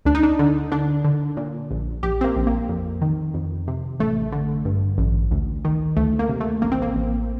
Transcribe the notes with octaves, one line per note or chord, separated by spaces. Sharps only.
D2 D4
D#4
D4
D3
D3 D4
D3
A#2
A#1
A#1 G4
C4
A#3
A#1
A#3
F2
D#3
F2
C3
A1 A3
D3
G2
A1
D2
D#3
D2 A3
A#3
C3
A3
A1 A#3
C4
A#3
A1